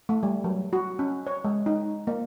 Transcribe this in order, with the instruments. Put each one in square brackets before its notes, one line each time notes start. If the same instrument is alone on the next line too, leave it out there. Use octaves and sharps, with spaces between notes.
[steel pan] A3
G3
F#3
F#4
C#4
C#5
G#3
D#4
A#3